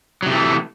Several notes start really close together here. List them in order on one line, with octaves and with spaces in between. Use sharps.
F#3 C3 A3 E3